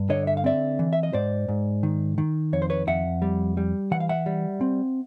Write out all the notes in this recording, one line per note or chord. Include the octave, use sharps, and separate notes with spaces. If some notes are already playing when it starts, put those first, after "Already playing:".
Already playing: G2
D3 C#5 D#5
E5
F5
C4 D5 E5
E3
E5
D#5
G#2 C5 D5
G#2
D#3
D#3
F2 C#5
C5
B4 C#5
F2 E5 F#5
G3
G3
E3 F#5
F5
E5 F#5
G3
C4